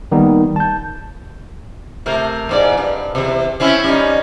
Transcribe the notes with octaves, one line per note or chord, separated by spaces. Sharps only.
D#3 G3 A#3 B3 D#4
A5 G6
C3 A3 A#4
E2 G#2 D5
G2
E2 C3
C4 C#4 E4
G3 C#4 D#4